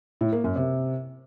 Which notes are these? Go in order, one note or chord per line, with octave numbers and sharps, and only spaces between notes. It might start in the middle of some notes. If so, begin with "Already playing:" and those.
A2
A#3
F#2
C3